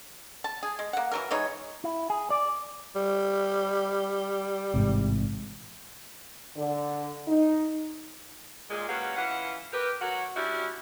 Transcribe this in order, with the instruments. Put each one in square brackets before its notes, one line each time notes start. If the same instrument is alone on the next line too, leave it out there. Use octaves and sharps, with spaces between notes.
[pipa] A5
G#4
G#3
A#3 F#5
E3 F#3 A#4
E3 G#3 D#4 C#5
[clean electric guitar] E4
G#4
D5
[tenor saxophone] G3
[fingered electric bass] A1 G#2 C3
[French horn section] D3
D#4
[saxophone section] A#2 G#3
F#3 A#3 C#4 F#4 G4 B4
E3 C#4 F4 F#5
G4 A#4 B4
F#3 F#4 A#4
G3 C#4 D4 E4 F#4 G4